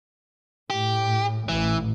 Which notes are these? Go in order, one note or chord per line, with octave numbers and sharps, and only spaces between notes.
A2 G4
A1 E3